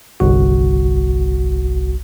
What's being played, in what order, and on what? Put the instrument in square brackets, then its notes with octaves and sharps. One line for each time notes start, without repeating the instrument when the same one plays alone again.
[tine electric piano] G1 C2 F#4